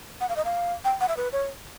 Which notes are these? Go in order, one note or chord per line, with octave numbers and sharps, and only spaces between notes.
F#5
F5
D#5
F5
G5
F#5
E5
B4
C#5